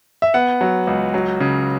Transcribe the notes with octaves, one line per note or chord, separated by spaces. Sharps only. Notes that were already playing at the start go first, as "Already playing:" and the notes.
E5
B3 F#5
F#3
C#2
F#3
C#3